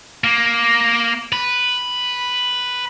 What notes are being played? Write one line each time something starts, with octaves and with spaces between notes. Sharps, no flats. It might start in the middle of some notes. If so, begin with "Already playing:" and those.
A#3
B4